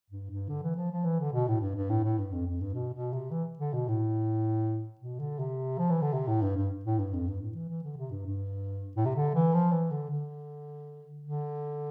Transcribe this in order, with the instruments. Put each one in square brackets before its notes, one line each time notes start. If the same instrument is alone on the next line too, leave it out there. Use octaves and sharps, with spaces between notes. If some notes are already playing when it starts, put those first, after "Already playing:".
[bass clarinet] G2
G2
D3
E3
F3
F3
E3
D3
B2
A2
G2
G2
A2
A2
G2
F2
F2
G2
B2
B2
C3
E3
D3
B2
A2
B2
D3
C3
F3
E3
D3
C3
A2
G2
G2
A2
G2
F2
G2
A2
E3
E3
D3
C3
G2
G2
A2
C3
D3
E3
F3
E3
D3
D3
D3